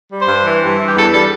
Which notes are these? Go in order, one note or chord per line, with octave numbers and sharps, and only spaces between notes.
G3
C5
G2
E3
G2
E3
G4
E2 A4
G3 A4